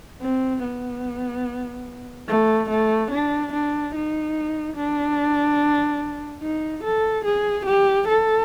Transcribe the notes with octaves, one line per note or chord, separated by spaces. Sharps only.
C4
B3
A3
A3
D4
D4
D#4
D4
D#4
A4
G#4
G4
A4